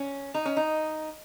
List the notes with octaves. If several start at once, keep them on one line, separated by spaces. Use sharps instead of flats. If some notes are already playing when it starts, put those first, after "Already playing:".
Already playing: C#4
D#4
C#4
D#4